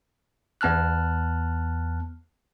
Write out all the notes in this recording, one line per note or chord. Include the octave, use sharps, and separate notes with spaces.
E2 B3 A5 F6 F#6